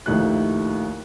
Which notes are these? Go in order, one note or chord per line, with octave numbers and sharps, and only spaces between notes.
A#1 D#2 A3 D#4 E4 F#6